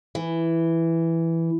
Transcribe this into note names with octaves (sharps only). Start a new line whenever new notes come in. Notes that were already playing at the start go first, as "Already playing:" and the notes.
E3